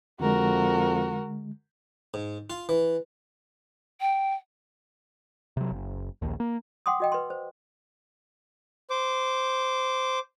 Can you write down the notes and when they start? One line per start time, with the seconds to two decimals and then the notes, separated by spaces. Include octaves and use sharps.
0.20 F2 D3 G#3 F#4 A#4
2.14 G#2
2.50 F4
2.69 E3
4.00 G5
5.57 C3 F#3
5.71 F#1
6.22 A#1 D#2
6.40 A#3
6.86 F#5 G5 C6 D6 D#6
7.00 F#4 D#5 G5
7.12 B4 C6
7.30 C5
8.90 C5 D6